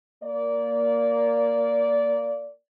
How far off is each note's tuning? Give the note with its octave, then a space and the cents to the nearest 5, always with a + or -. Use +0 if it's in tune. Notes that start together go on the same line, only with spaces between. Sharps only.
A#3 +0 D5 -20